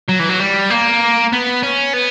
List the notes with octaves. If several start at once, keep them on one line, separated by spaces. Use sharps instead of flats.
F#3
E3
F#3
G3
A#3
B3
C#4
B3